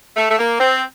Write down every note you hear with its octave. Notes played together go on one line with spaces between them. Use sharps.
A3
A3
A#3
C4